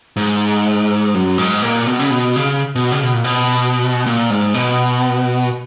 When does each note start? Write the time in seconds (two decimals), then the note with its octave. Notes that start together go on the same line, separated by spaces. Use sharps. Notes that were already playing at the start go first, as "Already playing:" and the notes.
0.16 G#2
1.14 F#2
1.38 G#2
1.62 A#2
1.86 B2
1.99 C#3
2.11 B2
2.36 C#3
2.75 B2
2.92 C#3
3.03 B2
3.13 A#2
3.24 B2
4.06 A#2
4.30 G#2
4.54 B2